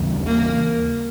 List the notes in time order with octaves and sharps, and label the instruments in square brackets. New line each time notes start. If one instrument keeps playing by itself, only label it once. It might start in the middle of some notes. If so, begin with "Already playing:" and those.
Already playing: [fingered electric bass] D#2 C#3 E3 G3
[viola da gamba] A#3